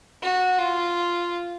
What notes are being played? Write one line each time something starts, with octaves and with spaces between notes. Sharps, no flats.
F#4
F4